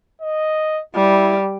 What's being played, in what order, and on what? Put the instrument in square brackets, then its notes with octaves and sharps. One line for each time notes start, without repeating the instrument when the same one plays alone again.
[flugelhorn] D#5
[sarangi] G3 [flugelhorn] E4